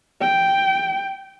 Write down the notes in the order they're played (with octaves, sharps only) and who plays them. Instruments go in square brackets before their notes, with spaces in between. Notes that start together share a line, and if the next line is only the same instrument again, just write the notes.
[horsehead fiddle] G5